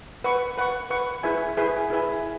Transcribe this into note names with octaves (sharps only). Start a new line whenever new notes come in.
B4 F#5 C#6
B4 F#5 C#6
B4 F#5 C#6
E4 G#4 B4 E5 G#5
E4 G#4 B4 E5 G#5
E4 G#4 B4 E5 G#5